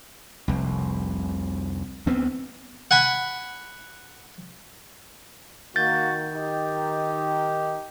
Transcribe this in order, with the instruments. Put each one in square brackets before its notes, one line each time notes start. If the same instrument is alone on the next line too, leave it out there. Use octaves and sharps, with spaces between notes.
[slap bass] F1 C2
D2 B3 C4
[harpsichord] F#5 G#5 B5
[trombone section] D#3 [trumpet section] A#3 F#4 [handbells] G6 A6
[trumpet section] D#4 G4